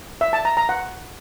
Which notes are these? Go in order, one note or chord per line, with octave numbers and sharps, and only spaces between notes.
E5
A5
A#5
A#5
F#5